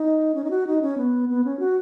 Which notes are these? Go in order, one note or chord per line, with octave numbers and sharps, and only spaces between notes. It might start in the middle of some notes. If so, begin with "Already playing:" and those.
Already playing: D#4
C#4
D#4
F#4
D#4
C#4
B3
B3
C#4
F#4